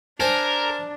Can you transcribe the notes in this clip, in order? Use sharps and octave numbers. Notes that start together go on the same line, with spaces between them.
D4 A#4 C5 G#5 A5